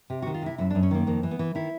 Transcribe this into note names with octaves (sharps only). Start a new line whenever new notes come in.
C3 G4
F#4
D#3
F4
C3 E4
F#2 E4
D4
F#2
C#4
D#3 A#3
F2 A#3
E3
B3
E3
D#3 E4